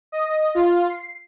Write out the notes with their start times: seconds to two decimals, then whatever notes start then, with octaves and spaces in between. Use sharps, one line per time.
0.12 D#5
0.55 F4
0.89 C7